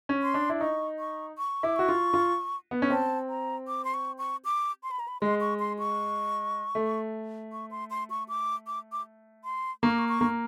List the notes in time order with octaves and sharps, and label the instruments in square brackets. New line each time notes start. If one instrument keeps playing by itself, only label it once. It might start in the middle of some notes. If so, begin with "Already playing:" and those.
[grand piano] C#4
[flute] C6
[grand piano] D4
E4
[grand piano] D#4 [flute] C#6
[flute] C#6
C#6
[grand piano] E4 [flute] D6
[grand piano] F#4 [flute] C#6
[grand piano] F4
F4
B3
C#4
[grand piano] C4 [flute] A5
[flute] A#5
D6
C6
C#6
C#6
D6
C6
B5
A#5
B5
[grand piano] G#3 [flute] C6
[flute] C#6
C6
C#6
[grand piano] A3
[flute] C#6
C6
C6
C#6
D6
D6
D6
C6
[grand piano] A#3 [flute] C#6
[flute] D6
C#6
C#6
[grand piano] A#3